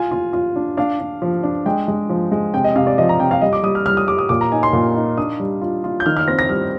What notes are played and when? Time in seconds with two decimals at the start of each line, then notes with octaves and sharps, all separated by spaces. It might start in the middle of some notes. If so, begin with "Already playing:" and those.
Already playing: F4 G#5
0.11 F4
0.33 F4
0.56 D4
0.77 D4 F5
1.00 D4
1.22 F3
1.43 D4
1.66 G#3 G5
1.88 G#3
2.09 F3
2.32 G#3
2.54 C3 G5
2.64 D#5
2.76 C3 F5
2.87 D5
2.98 F3 D#5
3.09 A#5
3.20 C3 G5
3.31 F5
3.41 G3 D#5
3.53 D6
3.63 G3 D#6
3.75 F6
3.86 G3 F6
3.97 D#6
4.08 G3 D6
4.18 D#6
4.29 A#2 D6
4.41 A#5
4.52 D#4 G#5
4.63 C6
4.73 A#2
4.96 D#4
5.17 D4 D#6
5.40 G3
5.61 F4
5.84 F4
6.00 G6
6.06 D#3 F6
6.17 F6
6.28 C4 A#6
6.39 A#6
6.49 G3 F6